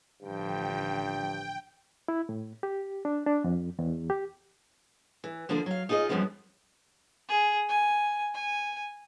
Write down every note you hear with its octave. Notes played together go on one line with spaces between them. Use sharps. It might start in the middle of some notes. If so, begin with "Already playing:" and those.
A1 G2 D3 F3 G5
E4
A2
G4
D4
D4
F2
E2
G4
E3
D3 F3 A#3 D4
F#3 F5
D#4 F4 G#4 C#5 D#5
F#2 A2 F3 G3 G#3 B3
G#4
G#5
G#5